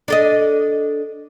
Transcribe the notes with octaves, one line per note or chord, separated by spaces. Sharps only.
D4 A4 D#5